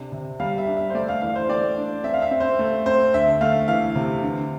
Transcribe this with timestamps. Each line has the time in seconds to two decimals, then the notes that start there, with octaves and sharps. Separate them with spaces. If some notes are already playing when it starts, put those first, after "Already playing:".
Already playing: C3 D4
0.12 C3
0.40 G3 F5
0.58 E5
0.67 D4
0.77 E5
0.90 C5
0.94 A3 D5
1.09 F5
1.22 E3 F5
1.36 C5
1.49 A3 D5
1.77 D4
2.04 C4 E5
2.14 F5
2.22 E5
2.31 C4
2.40 C5
2.59 A3
2.86 C4 C5
3.14 D2 E5
3.41 A3 F5
3.68 E3 F5
3.95 C3
4.23 D3